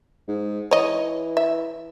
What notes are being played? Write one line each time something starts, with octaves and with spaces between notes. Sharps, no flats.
G#2
E3 C#5 D#5
E5